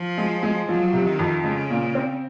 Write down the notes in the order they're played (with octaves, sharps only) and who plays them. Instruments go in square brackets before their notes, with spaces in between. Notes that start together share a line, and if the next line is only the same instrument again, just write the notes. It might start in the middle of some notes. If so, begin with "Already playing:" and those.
Already playing: [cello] F3
[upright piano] G#3
G#3
[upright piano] F3 [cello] F#3
[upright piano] C3
[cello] D#3
[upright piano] F2
[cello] C#3 [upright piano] G#3
[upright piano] A#2
C4